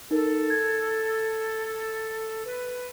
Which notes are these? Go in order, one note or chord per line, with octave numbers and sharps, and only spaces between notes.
D#4 A4 A#4
G#6
B4